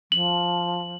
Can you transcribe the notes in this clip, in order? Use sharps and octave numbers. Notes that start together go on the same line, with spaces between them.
F3 F#7